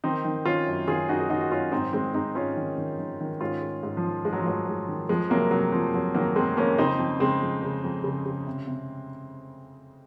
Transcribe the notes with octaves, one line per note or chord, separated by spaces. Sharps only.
D#3 C4 D#4
D#3
D#3 C#4 F4
F#2
D#3 F4 G#4
F#2 D#4 F#4
G#4
D#3 D#4 F#4
F#4
F#2 C#4 F4
G#2 C4 D#4
D#3 G#3 C4
G#2 C4 D#4
G#2 C#4 F4
D#3
D#3
D#3
D#3
G#2 C#4 F4
G#2
G#2
F3
D#3
G#2 G#3
F#3
F3
G#2 F#3
G#2
D#3
F2 F3 G#3
C3 F#3 A#3
C3 F#3
F2 F3
F2 F#3
D#3 F#3 A#3
F2 G#3 C4
F2 A#3 C#4
C#3 C4 D#4
F2
C#3 G#3 C4
F2
C#3
F2
C#3
C#3
C3
C3